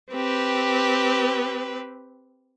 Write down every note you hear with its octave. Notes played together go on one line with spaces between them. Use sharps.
C4 G4 B4